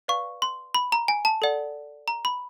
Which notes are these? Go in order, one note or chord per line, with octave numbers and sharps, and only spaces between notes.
B4 D5 F5 C#6
C6
B5
A#5
G#5
A5
A4 D5 F#5
A#5
B5